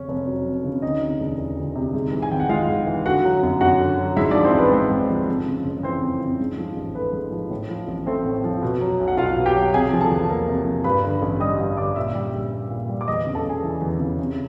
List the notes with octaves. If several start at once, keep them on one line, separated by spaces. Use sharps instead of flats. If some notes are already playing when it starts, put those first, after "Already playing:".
Already playing: F2 C#3 C#4
F1
F#3
F2
C#3
D2 D#4 D#5
C3
E1
E3
D2
C3
G#2
E3
G#5
G#1 G5
F#5
G#3 F4 F5
G#2
E3
D3 F#4 F#5
F#3
F#2
F#2 F#4 F#5
D3
F#3
G#2 E4 E5
D4 D5
F3
C4 C5
A1 B3 B4
G#3 C4 C5
G#2
F3
F2
C#3
F#1
E3 C4 C5
F2
C#3
G#2
F3
A1
A3 B3 B4
G#2
F3
A2
F3
A1
A3 C4 C5
A2
F3
B2
F#3
B1
F#5
B1 F4 F5
B2
G4 G5
F#3
C3 G#4 G#5
F3
A4 A5
E2
A#3
C3
F3
G2 B4 B5
D3
A1
G3 D#5 D#6
G2
D3 D5 D6
A#2 E5 E6
G3
A#1
A#3
A#2
G3
D6
E2 D#5 D#6
C#3
A4 A5
E1 G#4 G#5
E3
E2
C#3
C3